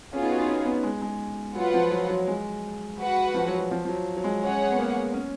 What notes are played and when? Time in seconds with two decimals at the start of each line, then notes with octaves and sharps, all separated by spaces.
0.13 B3 C#4 F4 G#4
0.22 D#4
0.30 F#4
0.40 D#4
0.48 C#4
0.66 B3
0.83 G#3
1.02 G#3
1.55 F#3 F4 B4 F#5
1.74 F3
1.91 F#3
2.10 F#3
2.28 G#3
2.99 F#4 B4 F#5
3.34 F3
3.47 F#3
3.59 F#3
3.71 F3
3.85 F3
3.89 F#3
4.16 F#3
4.24 G#3
4.42 C#4 G#4 C#5 F#5
4.72 B3
4.79 A#3
5.13 C#4